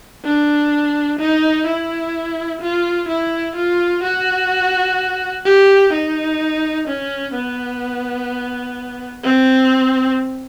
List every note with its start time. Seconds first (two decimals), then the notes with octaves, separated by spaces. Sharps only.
0.25 D4
1.19 D#4
1.67 E4
2.62 F4
3.09 E4
3.56 F4
4.03 F#4
5.45 G4
5.93 D#4
6.88 C#4
7.35 B3
9.24 C4